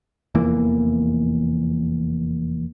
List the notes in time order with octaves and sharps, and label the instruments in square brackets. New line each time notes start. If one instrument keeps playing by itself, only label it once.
[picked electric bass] F1 E2 E3 A#3